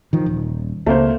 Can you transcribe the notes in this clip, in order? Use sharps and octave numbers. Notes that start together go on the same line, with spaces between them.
D#3 F3
D#1
C#2 A3 A#3 C5